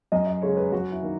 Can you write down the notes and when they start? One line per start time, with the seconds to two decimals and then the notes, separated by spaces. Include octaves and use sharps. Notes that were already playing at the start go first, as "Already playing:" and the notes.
0.12 F#2 D#5
0.27 D#5
0.42 C#3 G#3 C#5
0.57 B4
0.72 F#2 F#4
0.92 E4
1.02 D#3 A#3